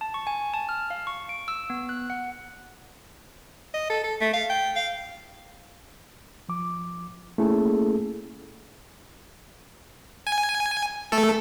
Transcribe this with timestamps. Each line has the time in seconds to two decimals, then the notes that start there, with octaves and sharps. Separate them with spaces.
0.01 A5
0.14 C#6
0.27 G#5
0.54 A5
0.69 F6
0.90 F5
1.07 C#6
1.29 D7
1.48 E6
1.70 B3
1.89 F#6
2.10 F#5
3.74 D#5
3.90 A4
4.04 A4
4.21 A3
4.33 F5
4.50 G5
4.76 F5
6.49 F3 D6
7.38 A3 A#3 C#4 E4 G#4 A4
10.27 G#5
11.12 A3 A4